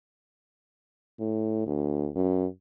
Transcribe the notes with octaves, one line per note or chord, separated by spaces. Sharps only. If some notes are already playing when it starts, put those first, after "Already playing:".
A2
D2
F#2